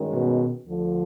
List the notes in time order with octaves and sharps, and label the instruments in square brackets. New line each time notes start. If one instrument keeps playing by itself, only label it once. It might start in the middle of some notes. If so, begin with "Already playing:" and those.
Already playing: [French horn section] G2 D#3 G#3 C#4 F#4
[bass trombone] B2
[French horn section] D2 D3 F3